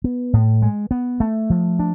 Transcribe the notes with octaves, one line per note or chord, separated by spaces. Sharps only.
B3
A2
G#3
B3
A3
F3
D4